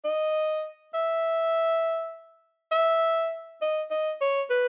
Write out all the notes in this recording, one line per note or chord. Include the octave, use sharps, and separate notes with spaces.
D#5
E5
E5
D#5
D#5
C#5
B4